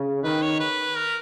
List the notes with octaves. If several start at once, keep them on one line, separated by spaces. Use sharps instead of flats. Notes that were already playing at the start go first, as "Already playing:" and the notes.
Already playing: C#3
D#3 B4
C#5
B4
A#4